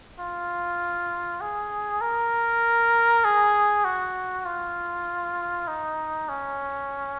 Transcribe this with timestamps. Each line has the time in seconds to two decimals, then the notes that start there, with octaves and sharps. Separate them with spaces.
0.20 F4
1.41 G#4
2.01 A#4
3.25 G#4
3.85 F#4
4.46 F4
5.68 D#4
6.29 C#4